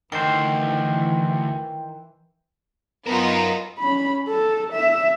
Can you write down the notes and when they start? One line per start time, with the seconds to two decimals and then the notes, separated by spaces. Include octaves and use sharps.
0.12 D2 D#3 E3 C5 G5
3.07 F#3 B3 D#4 F4 A#4
3.79 C#4 B5
4.28 A4
4.73 E5